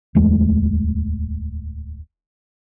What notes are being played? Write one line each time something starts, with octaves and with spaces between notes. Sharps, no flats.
D1 E2 G#3 A3